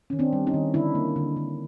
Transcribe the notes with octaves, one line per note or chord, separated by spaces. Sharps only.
D#3 C#4
C4 D4
G3
C#4 D#4
D#3
D3 D4 E4
A#3
D3
D3